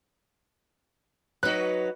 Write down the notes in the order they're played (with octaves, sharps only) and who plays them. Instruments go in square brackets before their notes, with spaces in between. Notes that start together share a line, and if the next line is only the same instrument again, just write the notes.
[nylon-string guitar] F#3 D#4 [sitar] F#4 B4 [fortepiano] F#6